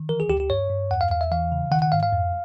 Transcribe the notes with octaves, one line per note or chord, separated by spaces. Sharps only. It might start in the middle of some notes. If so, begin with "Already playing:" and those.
Already playing: D#3
E3 A#4
G#4
D2 G4
G4
G2 C#5
G2
E2 F#5
F5
E2 F5
E5
E3 F5
C#3
D#3 F#5
F#5
G#2 F5
F5
F2